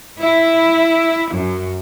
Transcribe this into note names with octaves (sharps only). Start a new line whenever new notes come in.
E4
F#2